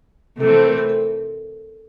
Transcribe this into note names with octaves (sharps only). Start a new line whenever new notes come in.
C3 E3 A3 C4 A4
A4
A#4
A4
A4